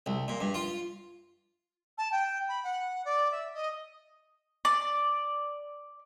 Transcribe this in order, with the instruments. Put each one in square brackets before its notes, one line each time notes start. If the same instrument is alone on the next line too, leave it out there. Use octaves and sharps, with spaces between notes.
[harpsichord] C2
A#2
G2
F4
[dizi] A5
G5
B5
F#5
D5
E5
D#5
[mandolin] D5